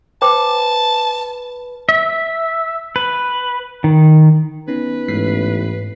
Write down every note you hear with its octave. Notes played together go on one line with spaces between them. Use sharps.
B4 C5 G5 A5 D6
E5
B4
D#3
B3 C#4 D#4 B4
A1 G#2 B6 C7